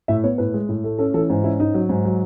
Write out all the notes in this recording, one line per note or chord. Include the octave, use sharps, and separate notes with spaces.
A2 E5
B3 C#5
A2 B4
G#3
A2
A3
C#4 A4
E3 A4
G#2
C#4 E4
G#2 D#4
F#3
G#2
F#3